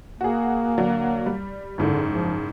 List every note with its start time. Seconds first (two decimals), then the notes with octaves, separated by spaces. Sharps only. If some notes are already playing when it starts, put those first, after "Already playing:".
0.21 A#3 F#4 G#4
0.78 D3 F#3 D4
1.26 G3
1.78 F#1 G#2 D3 E4
2.10 F3